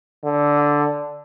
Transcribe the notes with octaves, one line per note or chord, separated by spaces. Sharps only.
D3